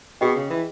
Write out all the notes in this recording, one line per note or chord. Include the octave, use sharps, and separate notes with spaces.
B2 G#4 D#5 G5
C#3
E3